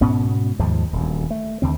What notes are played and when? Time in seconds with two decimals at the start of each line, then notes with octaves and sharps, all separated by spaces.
0.01 G#2 B2 B3 C#4
0.59 D#2 G#2 F3 G#3
0.93 D#1 D2
1.30 A3
1.62 D#2 D3 C4